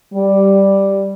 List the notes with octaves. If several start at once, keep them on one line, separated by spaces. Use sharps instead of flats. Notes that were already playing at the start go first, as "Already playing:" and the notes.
G3